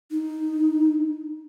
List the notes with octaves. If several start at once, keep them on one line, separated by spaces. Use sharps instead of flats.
D#4